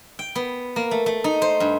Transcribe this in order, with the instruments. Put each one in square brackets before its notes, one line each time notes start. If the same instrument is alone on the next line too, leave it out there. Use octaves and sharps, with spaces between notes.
[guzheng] G5
B3
A#3
A3
A3
D#4
C5
G2